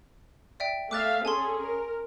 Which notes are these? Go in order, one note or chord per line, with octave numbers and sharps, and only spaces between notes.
D5 E5 G5
A3 E5 F5 D6 F#6 A6
C#4 G#4 A4 G#5 A5 C6
A#4